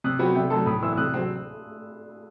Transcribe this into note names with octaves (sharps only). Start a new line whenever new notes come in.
C3 D#6 F#6
F#3 B3 F#4 G5 B5
C3 E5 G5
F#3 A3 D#4 A4 A5 C6
A2 B5 D#6
E3 B3 E4 C6 E6
E6
C3 D#6 F#6
F#3 C4